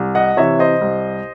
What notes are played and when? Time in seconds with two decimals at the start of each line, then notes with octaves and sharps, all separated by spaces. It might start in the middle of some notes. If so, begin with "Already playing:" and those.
Already playing: C2
0.15 D#5 F#5
0.37 C3 E3 C#5 E5
0.59 C5 D#5
0.81 C2